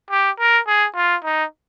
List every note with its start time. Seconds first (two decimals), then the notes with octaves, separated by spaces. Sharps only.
0.10 G4
0.40 A#4
0.67 G#4
0.96 F4
1.24 D#4